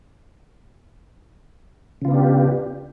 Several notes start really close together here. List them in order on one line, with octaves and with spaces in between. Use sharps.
C#3 F4 B3 D4 G4